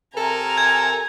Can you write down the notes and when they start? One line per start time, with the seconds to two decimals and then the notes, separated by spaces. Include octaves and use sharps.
0.16 C3 A4 A#4 G#5 A#5
0.58 G#6